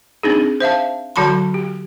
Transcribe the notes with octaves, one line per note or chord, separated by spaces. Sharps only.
C4 D4 D#4 G#4
C5 E5 F5 A5
D3 F#3 F#4 A5 B5 C6
G4